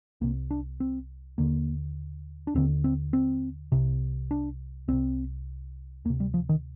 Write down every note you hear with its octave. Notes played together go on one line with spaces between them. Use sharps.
C2 C3 A#3
D4
C4
D#2 D3 A#3
D4
D#2 D3 C4
C4
C4
C2 C3
D4
C2 C3 C4
D2 C3 A#3
G3
F3
D#3